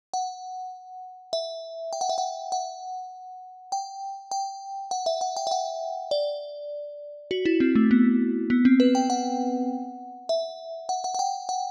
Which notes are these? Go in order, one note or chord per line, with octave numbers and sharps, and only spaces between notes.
F#5
E5
G5
F#5
E5
F#5
F#5
G5
G5
F#5
E5
F#5
G5
E5
F#5
D5
F#4
E4
C4
A3
B3
B3
C4
B4
G5
F#5
E5
F#5
F#5
F#5
G5
F#5